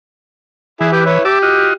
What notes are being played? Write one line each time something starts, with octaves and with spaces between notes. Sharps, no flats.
E3 E4 G#4
G4 B4
E4 B4 C#5
G4 E5 A5 D6
F4 F#4 D#5